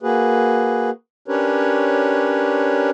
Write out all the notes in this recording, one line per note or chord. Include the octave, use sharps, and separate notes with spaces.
A#3 F#4 G#4 B4
C#4 D4 G4 A#4 B4 C#5